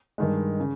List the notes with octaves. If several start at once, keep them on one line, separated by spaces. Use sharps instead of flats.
G2 D#3 G#3
C#3